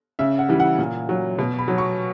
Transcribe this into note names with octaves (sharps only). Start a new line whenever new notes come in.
C#3 E5
F#5
E3 G3
F#5
A#2
F#3
B2
B5
F#3
C#6